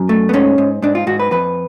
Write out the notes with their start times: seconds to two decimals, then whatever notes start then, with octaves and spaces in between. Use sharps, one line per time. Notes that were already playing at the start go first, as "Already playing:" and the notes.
Already playing: F#2
0.09 A3
0.29 B3
0.33 G#2 C#4
0.58 G#2
0.82 G#2 D4
0.95 F4
1.07 G#2 F#4
1.19 B4
1.31 F2 B4